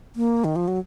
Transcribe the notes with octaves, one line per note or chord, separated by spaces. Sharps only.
A#3
D#3
F3
F#3